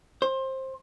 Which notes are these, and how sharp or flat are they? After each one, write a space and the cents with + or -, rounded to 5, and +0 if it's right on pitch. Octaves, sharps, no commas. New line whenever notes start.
C5 +20